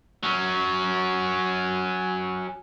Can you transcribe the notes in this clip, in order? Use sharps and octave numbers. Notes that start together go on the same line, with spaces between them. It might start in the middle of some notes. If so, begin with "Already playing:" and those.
F#3 C#4